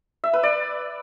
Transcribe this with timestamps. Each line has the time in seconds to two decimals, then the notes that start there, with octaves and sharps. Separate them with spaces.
0.24 E5
0.33 B4
0.43 D5